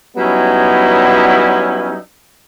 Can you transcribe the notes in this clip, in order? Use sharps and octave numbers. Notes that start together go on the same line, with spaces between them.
F#3 G3 B3 C#4 D#4 E4